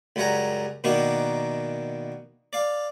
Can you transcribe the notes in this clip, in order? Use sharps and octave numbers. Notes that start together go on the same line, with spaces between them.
C#2 F#2 G3 F#5 G#5 A#5
B2 D#3 A#3 D4 F#4 A#4
D5 F5